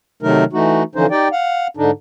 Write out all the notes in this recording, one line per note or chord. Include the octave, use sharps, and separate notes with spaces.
C3 D#3 F#3 A3 D#4 A#4
E3 A3 D#4 F#4
D3 E3 F3 C#4 D#4 C5
D#4 G4 D5 G5
F5 F#5
G#2 D3 D4 D#4